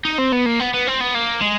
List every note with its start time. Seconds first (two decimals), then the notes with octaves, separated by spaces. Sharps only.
0.05 D#4
0.18 C4
0.32 B3
0.46 A#3
0.60 B3
0.73 B3
0.87 C4
1.00 B3
1.14 A#3
1.41 G#3